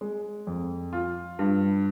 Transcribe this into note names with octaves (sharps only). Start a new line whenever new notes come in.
G#3
F2
F4
G2